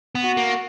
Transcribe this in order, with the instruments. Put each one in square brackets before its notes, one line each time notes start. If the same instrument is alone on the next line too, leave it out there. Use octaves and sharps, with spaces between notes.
[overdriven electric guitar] B3
[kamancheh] F#4
[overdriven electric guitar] A#3